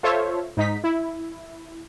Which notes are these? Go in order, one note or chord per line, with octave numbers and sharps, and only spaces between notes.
F4 A4 C5 C#5 E5
G#2 D#4 B6
E4